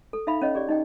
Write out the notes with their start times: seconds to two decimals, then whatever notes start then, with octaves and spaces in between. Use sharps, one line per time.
0.13 A4
0.27 D#4 E5 F5 B5
0.42 C#4 C#5 D#5
0.55 G4 G#4 D5
0.69 D#4 D#5 G5